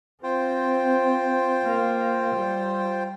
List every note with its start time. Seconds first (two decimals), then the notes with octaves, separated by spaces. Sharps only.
0.23 C4 F4 C5 G5
1.63 A#3
2.34 G3